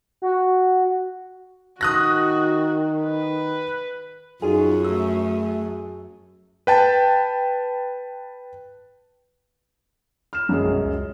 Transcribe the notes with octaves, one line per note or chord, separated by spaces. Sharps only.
F#4
D#3 F#4 D#6 F#6 A#6
B4
F#2 D#4 F4 F#4 G#4 A4
A3 E6
B4 G5 A5
F6 E7
F#2 D#3 F3 G3 G#3
A#1 B2
C#2